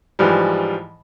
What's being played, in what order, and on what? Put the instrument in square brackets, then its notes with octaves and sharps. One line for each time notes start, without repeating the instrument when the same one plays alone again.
[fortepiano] G#2 E3 F3 G3